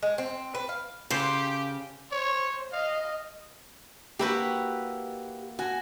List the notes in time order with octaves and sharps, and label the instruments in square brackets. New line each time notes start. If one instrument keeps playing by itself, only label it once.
[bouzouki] G#3
C4
B4
F5
[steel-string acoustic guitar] C#3 [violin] G4 [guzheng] A4 B4 C5
[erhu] C5 [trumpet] C#5
[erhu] D#5 [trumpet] F5
[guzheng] A#3 E4 F#4 [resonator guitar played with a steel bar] G4 B4
[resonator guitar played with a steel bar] F#4 [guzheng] G#5